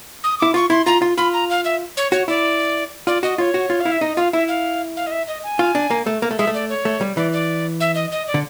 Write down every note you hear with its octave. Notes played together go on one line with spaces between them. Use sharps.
D#6
E4 D6
F4 C#6
E4 C6
F4 A#5
F4
F4 B5
A#5
F5
E5
C#5
F#4 C#5
E4 D5
F4 D5
F#4 D#5
F4 C#5
F#4
F4
F5
E4
E5
D#4 D#5
F4 F5
E4 E5
F5
F5
D#5
E5
D#5
G#5
F4
D4
A#3
A3
A#3
A3
G#3 E5
A3
D5
C#5
A3
G3
E3 D5
D5
E5
D#5
D#5
D5
D3